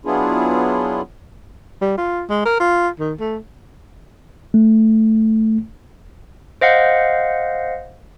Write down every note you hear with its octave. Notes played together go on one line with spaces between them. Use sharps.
F#3 B3 D4 E4 F4 G#4
G3
F4
G#3
A#4
F4
D#3
A3
A3
C5 D#5 F5 F#5